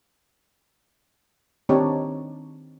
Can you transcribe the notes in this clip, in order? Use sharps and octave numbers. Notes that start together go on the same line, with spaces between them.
D#3 C4 D4 D#4 G4 C#5